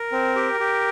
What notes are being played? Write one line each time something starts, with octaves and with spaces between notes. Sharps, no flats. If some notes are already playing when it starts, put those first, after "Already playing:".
Already playing: A#4
C4
G4
G4